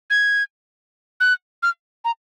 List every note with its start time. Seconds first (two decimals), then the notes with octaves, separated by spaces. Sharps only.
0.10 G#6
1.20 F#6
1.63 F6
2.05 A#5